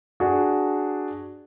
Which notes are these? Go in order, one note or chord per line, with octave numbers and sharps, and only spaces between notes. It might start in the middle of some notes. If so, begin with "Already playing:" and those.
D4 F#4 G#4